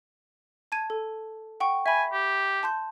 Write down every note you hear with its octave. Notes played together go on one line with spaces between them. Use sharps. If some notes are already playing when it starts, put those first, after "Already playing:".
A5 G#6 D#7
A4
F#5 G5 C#6
E5 G#5 B5
G4
A5 C6 G6